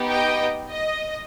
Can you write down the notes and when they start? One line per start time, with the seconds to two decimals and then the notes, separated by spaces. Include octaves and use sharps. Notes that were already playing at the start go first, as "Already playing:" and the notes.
Already playing: B3 D#4 G4
0.09 D#5 G5
0.71 D#5